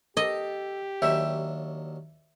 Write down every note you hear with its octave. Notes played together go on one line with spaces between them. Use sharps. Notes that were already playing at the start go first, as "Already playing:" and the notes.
G4 A4 D#5
D#2 F#3 D4 E5